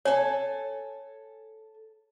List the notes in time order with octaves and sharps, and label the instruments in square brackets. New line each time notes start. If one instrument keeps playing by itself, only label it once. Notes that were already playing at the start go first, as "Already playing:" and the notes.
[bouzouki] A4 G#5 [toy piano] C#5